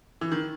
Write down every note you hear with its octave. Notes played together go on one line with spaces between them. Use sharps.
E3
D#3